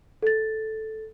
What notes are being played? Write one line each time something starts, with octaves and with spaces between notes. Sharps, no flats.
A4 A6